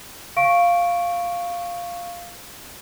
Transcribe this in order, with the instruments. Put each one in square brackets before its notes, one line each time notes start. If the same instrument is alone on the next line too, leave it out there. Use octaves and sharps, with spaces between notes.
[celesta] F5 C#6 D7